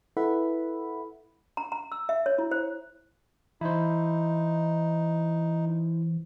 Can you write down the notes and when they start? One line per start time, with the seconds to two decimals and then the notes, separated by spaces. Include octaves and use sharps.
0.17 E4 A4 B4 E5 F#5 B5
1.57 A#5
1.72 A#5
1.92 E6
2.09 E5
2.26 C#5
2.38 E4
2.51 C5
3.61 E3 D#4 E4 C5